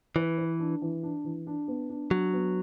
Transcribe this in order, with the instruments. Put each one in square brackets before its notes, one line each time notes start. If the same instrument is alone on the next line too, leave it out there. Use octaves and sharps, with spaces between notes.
[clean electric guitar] E3 [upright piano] B4
[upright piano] B4
D4
E3
D4
E3
D4
B3
D4
[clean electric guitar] F#3 [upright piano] D4
[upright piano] B3